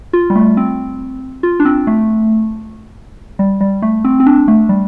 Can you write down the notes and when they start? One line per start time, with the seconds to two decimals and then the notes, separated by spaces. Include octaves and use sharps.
0.13 F4
0.30 G3
0.35 A3
0.57 C4
1.43 F4
1.60 D4
1.65 C4
1.87 A3
3.39 G3
3.61 G3
3.82 A3
4.05 C4
4.20 C4
4.26 D4
4.48 A3
4.69 G3